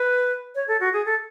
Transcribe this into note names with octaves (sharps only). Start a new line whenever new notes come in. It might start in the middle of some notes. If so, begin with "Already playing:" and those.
Already playing: B4
C#5
A4
F#4
G#4
A4